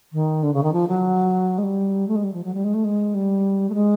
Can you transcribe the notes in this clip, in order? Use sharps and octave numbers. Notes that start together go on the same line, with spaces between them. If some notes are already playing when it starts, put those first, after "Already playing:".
D#3
D3
C#3
D#3
F3
F#3
G#3
G3
A3
G#3
G3
F3
F#3
G3
G#3
A3
G#3
G3
A3
G#3